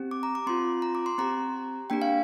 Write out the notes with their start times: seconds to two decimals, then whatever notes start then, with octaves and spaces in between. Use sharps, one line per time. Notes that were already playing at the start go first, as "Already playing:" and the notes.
Already playing: C4 G4
0.11 D6
0.23 A#5
0.35 D6
0.47 C4 F4 C6
0.82 A#5
0.95 D6
1.06 C6
1.18 C4 G4 A#5
1.90 A#3 D4 G4 G5
2.02 F5